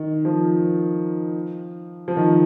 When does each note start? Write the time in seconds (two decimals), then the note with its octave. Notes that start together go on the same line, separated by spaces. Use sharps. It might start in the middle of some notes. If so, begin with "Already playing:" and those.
Already playing: D#3
0.25 F3
2.08 F3
2.16 D#3